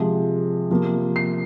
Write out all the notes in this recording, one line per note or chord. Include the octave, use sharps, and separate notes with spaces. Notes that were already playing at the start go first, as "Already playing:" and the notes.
Already playing: C3 F3 G#3
C3 F3 A#3
C7